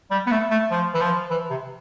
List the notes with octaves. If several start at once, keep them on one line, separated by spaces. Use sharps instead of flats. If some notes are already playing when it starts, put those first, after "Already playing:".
G3
B3
A3
A3
F3
E3
F3
E3
C3